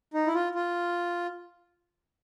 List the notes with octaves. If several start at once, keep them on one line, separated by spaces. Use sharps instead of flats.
D#4
E4
F4
F4